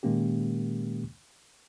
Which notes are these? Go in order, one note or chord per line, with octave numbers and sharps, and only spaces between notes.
A#2 D#3 G#3 A#3 C#4 G4